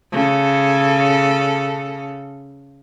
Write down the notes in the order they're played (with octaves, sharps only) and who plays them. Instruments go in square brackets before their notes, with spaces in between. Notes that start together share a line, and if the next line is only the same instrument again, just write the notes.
[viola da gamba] C#3 A4